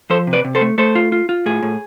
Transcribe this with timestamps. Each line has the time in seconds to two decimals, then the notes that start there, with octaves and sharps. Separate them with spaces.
0.10 F3 A4 C5
0.27 C3
0.33 B4 D5
0.45 C3
0.55 A4 C5
0.61 A3
0.78 A3 A4 C5
0.95 F4
1.12 F4
1.29 F4
1.46 A2 G#4
1.63 A2